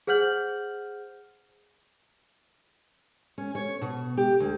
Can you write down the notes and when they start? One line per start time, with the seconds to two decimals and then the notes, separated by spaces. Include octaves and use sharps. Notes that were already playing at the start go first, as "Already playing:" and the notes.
0.07 G#4 C5 F#5 F6 G6 F#7
3.38 C#4
3.55 C#5
3.81 B2
4.17 G4
4.40 D2